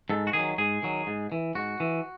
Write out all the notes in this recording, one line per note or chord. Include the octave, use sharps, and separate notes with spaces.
G#2 A4
F#4
D#3 G#4
F#3
G#2 G#4
D#3 F#3
G#2
E3
G#2 F#4
E3